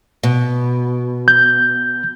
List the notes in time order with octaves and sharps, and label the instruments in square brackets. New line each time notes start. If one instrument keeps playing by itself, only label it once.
[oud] B2
[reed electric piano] G6